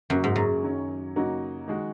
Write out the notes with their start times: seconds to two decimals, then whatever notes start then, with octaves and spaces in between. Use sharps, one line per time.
0.10 F#2 C#3 F#3 A#3 F#4
0.24 G#2
0.36 F#2
0.63 D#3 F#3 C#4
1.16 C#3 F#3 A#3 D#4 F#4
1.68 D#3 G#3 F#4